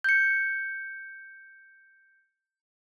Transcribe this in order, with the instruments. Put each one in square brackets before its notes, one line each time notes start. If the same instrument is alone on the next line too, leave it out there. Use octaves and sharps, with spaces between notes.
[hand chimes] G6 C#7